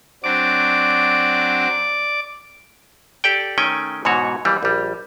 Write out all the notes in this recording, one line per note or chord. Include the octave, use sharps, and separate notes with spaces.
F#3 C4 D4 D5 D6
G4 A4 D5 G5
D#3 A3 C#4 G5 G#5
G#2 B2 E3 F#4 C#5
D#2 E3 G3
A#1 G3